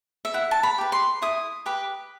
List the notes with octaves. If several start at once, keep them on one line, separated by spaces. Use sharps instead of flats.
E5
E4 F#5
A5
B5
G4 B4
C6
E4 D#6
G4 B4